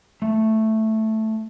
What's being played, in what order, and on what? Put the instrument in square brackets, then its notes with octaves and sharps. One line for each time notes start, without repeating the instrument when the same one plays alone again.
[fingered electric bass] A3